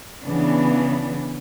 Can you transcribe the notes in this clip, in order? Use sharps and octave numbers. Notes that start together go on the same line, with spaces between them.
C#3 E3 B3 D4